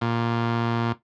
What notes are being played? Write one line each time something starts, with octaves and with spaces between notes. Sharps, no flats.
A#2